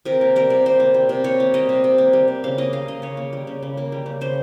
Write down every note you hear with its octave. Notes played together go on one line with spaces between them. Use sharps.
C3 A#4
A#3
G3 A#4
C3
C3 C5
A#3
G3
C3
C3 C#5
A#3
G3 D#5
C3
C3
A#3
G3
C3
C#3 F5
A#3 D#5
G3 F5
C#3 D#5
C#3 C#5
A#3
G3
C#3
C#3
A#3
G3
C#3
C#3 C5